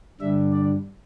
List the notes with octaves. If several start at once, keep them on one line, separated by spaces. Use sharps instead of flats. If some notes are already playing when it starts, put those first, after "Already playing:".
G2 D3 G3 D4 E5
D5